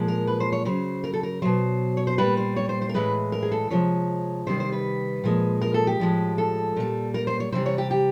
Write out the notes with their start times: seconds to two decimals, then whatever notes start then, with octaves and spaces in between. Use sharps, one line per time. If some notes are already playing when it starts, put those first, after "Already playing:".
Already playing: A#2 F3 G#3
0.08 A#4
0.27 B4
0.40 C5
0.52 C#5
0.65 C#3 F#3 C5
1.04 A#4
1.14 A4
1.23 A#4
1.42 B2 F#3 C5
1.97 C#5
2.07 C5
2.18 A#2 G3 B4
2.37 C5
2.56 C#5
2.69 C5
2.82 C5
2.89 A#4
2.94 A2 E3 G#3 B4
3.32 A#4
3.43 G#4
3.52 A4
3.70 C3 F3 G#3 C#5
4.47 C3 D#3 G3 C5
4.60 C5
4.72 B4
5.24 A#2 F3 G#3
5.62 A#4
5.74 A4
5.87 G4
6.00 A2 F3 G#3
6.38 A4
6.76 A#2 G3
7.14 A#4
7.27 C5
7.40 C#5
7.52 C3 E3 G3 C5
7.66 C#5
7.78 G4
7.91 G4